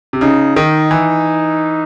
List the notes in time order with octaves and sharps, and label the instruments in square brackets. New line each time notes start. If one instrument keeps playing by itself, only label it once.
[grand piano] C3
[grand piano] C#3 [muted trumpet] D#4
[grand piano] D#3 [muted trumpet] D#4
[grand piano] E3